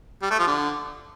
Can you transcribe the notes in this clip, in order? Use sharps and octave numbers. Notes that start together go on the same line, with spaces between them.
G3
A3
F3
D3